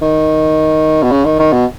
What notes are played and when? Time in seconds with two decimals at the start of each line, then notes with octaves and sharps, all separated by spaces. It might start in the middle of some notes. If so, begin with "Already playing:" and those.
0.01 D#3
1.03 B2
1.11 C#3
1.25 D#3
1.39 D#3
1.52 B2